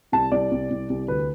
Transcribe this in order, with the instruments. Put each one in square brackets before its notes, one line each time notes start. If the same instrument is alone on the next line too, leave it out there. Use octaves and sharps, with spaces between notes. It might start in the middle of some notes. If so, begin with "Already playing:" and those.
[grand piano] C2 A5
C2 D5
C2
C2
C2
D2 B4